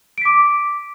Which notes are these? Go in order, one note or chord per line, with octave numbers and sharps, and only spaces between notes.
D6 B6 D7